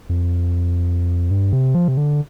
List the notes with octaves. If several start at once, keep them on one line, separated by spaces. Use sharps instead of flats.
F2
G2
C3
F3
C3
D3